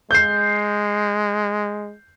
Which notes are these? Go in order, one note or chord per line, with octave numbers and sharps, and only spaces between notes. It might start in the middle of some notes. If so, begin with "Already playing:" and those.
G#3 G6 C7